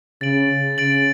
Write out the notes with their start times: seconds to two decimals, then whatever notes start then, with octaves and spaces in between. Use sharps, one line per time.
0.21 C#3 A6 D7 F#7
0.78 C#3 A6 D7 F#7